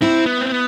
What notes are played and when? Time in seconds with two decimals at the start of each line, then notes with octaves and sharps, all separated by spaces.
0.01 C4 E4
0.26 B3
0.41 C4
0.52 B3